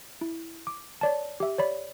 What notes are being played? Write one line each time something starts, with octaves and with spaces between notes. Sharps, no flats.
E4
D6
C#5 D5 A5
G4 E5
C#5 D5 B5